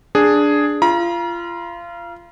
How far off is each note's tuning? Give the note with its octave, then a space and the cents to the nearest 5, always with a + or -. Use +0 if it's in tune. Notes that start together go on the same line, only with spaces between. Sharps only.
D4 +0 G#4 +0
F4 -25 A#5 +40